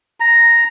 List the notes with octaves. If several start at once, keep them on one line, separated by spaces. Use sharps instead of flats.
A#5